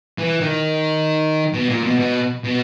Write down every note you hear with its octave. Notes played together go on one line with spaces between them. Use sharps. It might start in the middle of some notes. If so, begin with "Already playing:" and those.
E3
D#3
B2
A#2
B2
B2
B2